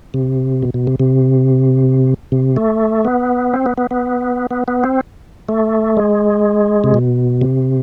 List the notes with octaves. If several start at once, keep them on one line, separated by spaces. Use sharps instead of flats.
C3
B2
B2
C3
C3
C3
A3
B3
C4
B3
B3
B3
B3
B3
C4
A3
G#3
C3
B2
C3